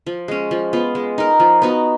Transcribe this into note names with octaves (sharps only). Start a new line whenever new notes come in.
F3
G#3 C#4
F3
B3 F4
G#3
D#4 A#4
F3
B3 D#4 F#4